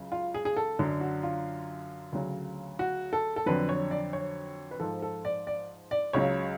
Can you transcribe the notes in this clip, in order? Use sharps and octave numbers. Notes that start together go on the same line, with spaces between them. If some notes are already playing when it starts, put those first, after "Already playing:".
Already playing: C#2 C#3 F#3
F4
G#4
G#4
A4
F#2 D3 F#3
F#4
F4
D2 C#3 F#3
F#4
A4
A4
F2 D3 F#3 B4
C#5
D5
C#5
B4
G#2 F3 A4
A4
D5
D5
D5
C#2 C#3 F#3 C#5